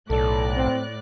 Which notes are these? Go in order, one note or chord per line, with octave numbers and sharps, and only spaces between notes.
B1 A2 A4 D5 F#6
C4